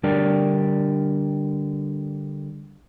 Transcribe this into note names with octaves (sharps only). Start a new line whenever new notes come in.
D3 G3 D4 G4 A#4 D5